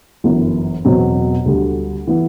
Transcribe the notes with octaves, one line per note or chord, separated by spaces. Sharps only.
G1 F#2 E3
E1 E2 B2 F#3 C4
D2 D3 G3
E3 B3 E4